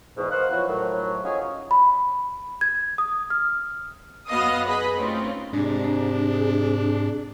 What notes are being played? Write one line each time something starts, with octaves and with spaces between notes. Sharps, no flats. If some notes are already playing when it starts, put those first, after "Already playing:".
E2 G#2 B2
A#4 C5 D#5 F5 F#5
F3 F#3 B3 E4 F#4
A2 D#3 F3 F#3
C#4 D#4 F4 F#4 G#4 C#5
B5
G#6
D#6
F6
F#2 B3 F#4 D#5 F5 D#6
G#4 B4 D#5 B5
A3 C4 C#4 D#4 F4
G#2 C3 D4 G#4